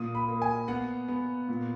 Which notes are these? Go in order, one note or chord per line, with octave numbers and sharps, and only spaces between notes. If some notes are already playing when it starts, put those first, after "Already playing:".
Already playing: A#2 D#6
B5
A#3
G#5
B3 F#5
B3
A#2